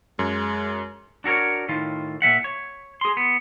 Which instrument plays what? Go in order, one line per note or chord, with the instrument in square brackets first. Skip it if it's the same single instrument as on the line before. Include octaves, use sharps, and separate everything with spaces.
[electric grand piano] F#2 [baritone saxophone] G#3
[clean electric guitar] D4 F#4 A4 A#4 C#5
A2 D#3 F4
A#2 F#3 E5 F#5
C#5
G#4 C6
B3